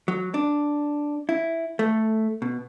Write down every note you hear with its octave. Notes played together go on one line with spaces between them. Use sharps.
F#3
D4
E4
A3
B2